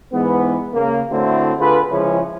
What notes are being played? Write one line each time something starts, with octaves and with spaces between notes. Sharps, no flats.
G#2 E3 G#3 B3
C#3 A#3
A2 D3 A3 C4 E4 F#4
D3 F4 G#4 B4
C#3 F3 G#3 C#4 E4 G#4